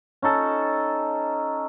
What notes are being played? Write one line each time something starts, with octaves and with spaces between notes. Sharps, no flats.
C#4 D#4 A4